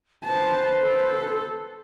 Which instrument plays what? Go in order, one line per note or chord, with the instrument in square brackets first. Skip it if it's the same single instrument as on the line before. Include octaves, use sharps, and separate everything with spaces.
[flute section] B4 C5 [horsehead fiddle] A5
[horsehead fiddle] A4